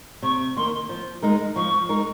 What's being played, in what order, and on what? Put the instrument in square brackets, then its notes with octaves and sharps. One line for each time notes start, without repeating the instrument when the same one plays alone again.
[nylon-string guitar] C3 [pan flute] C#6
[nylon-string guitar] D#3 A#3 [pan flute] C6
[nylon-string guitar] F3
G#3 D#4 A#4
[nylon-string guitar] F3 [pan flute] C#6
[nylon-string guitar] G#3 D#4 A#4